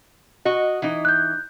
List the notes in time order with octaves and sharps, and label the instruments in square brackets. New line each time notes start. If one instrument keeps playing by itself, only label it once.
[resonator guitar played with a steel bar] F#4 D#5
E3 D#4
[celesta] F#6 G6